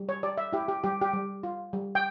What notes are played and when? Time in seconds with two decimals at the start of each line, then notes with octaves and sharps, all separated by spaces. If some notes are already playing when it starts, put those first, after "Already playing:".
Already playing: G3
0.09 C#5
0.23 G4 D5
0.38 E5
0.53 E4 G4
0.68 G4
0.84 G3 G4
1.01 G4
1.13 G3
1.43 F4
1.73 G3
1.95 G5